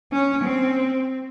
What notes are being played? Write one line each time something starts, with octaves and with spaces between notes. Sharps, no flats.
C#4
C4